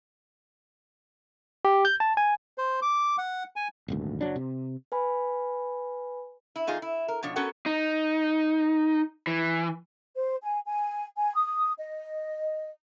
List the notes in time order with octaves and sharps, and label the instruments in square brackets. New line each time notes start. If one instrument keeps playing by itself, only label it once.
[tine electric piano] G4
G6
A5
G#5
[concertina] C5
D6
F#5
G#5
[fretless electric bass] D#1 G#1 D2
F#1 F#3 D4
C3
[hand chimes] B4 G#5 B5
[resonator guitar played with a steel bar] E4
E2 D#4 F4 G#4
E4
A#4
B2 F3 D4 C#5
B3 C#4 F#4 A4 A#4 F#5
[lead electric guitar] D#4
E3
[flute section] C5
G#5
G#5
G#5
D#6
D#5